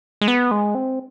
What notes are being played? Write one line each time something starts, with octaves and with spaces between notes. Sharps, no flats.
G#3
B3
G#3
C4